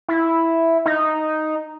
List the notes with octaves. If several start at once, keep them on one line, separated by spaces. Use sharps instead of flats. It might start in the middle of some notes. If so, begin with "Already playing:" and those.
E4
D#4